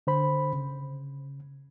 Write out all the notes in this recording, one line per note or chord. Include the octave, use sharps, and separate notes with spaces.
D3 C5 B5
C#3